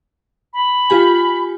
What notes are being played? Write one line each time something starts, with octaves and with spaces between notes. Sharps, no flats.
B5
F4 G4 G#5